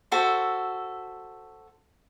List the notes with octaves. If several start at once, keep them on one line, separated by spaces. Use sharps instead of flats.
F#4 A4 C5 E5